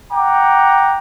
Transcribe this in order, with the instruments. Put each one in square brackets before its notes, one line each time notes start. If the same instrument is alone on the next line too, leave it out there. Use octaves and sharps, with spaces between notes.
[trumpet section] F#5 G5 A#5 D6